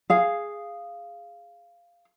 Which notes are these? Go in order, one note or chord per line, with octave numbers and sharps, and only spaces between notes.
G#4 F5